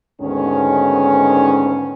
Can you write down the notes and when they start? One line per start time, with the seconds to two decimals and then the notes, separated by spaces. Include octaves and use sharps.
0.21 D2 G#2 D#3 B3 C#4